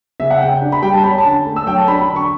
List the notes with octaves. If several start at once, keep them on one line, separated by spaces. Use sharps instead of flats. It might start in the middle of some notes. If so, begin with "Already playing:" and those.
C#3 E5
F#5
C#3 G5
D4
B5
G3 G5
A5
C#4 B5
A5
D3
A3
E6
F#3 G5
A5
D4 B5
B5
D3
C#6